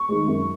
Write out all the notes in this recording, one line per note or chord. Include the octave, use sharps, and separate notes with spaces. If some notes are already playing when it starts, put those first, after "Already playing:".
Already playing: C#6
D#3 G#3
F#2